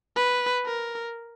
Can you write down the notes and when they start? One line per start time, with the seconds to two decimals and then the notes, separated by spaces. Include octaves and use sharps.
0.16 B4
0.66 A#4